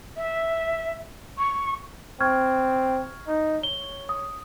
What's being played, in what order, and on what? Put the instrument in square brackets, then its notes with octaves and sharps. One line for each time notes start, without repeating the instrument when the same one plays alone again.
[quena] E5
C#6
[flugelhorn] C4 [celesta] C#6 F6 G#6
[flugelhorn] D#4
[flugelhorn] C#5 [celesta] G7
[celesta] D#6